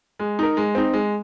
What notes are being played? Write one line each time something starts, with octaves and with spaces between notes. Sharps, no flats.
G#3
D#4 A#4
G#3
C4 D#4
G#3